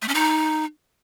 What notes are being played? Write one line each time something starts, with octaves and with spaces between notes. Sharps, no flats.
A3
C#4
D#4